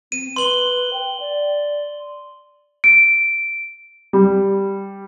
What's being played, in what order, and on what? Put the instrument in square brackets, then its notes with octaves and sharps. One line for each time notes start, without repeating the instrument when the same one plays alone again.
[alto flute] C4 [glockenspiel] D#7
[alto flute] B4 [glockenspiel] C6 F#7 G7
[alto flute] G5
D5
[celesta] D7
[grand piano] G3